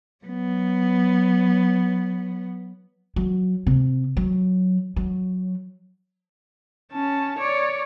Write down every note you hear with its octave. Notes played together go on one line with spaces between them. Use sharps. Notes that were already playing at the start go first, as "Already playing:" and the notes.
F#3 B3
F#3
C3
F#3
F#3
C#4 A5
C#5 D5